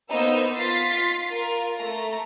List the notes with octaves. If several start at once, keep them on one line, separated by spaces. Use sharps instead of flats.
A#3 B3 D#4 C5 E6
F4 C6 A6 B6 C7
F4 A#4
A3 A#5